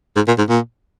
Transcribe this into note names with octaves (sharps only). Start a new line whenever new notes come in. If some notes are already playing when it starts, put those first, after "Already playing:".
G#2
A#2
G#2
A#2